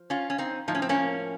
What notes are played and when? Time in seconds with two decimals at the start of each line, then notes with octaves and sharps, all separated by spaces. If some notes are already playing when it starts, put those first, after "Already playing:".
Already playing: F3
0.10 C#4 F4
0.30 C#4
0.38 C4 D#4
0.68 A2 F3 D#4
0.75 C#4
0.82 C4
0.89 A#3 C#4